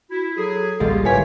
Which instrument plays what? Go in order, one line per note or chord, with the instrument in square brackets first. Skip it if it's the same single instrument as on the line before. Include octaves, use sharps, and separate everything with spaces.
[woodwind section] E4 [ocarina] F#4
[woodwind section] F#3 G#4 [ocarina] A4
[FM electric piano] A1 D2 [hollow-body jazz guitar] G#2 G3 G#3 [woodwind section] A#3 B3 F4
[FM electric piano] A1 G#5 B6 [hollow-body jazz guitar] G3 A#3 E4 [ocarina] B4 [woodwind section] C#5